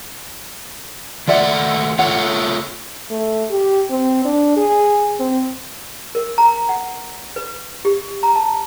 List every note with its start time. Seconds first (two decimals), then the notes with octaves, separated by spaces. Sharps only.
1.28 D#3 A3 F4 D5 E5 F#5
1.99 A3 F4 A4 C#5 F#5
3.10 A3
3.51 G4
3.90 C4
4.25 D4
4.57 G#4
5.20 C4
6.15 A#4
6.38 A#5
6.69 F#5
7.36 B4
7.85 G4
8.23 A#5
8.36 A5